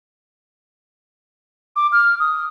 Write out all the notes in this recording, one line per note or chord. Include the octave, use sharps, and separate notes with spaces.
D6
F6
D#6